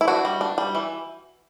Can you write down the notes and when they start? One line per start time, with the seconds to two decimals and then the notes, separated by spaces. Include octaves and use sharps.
0.01 E4
0.08 D4 F#4
0.25 G3
0.41 D4
0.58 G3
0.75 E3